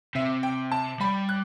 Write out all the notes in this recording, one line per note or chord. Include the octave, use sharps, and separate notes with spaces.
C3 E5
G5
A5
G3 B5
F#6